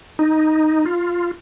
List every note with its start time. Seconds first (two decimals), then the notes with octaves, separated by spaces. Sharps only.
0.19 D#4
0.86 F4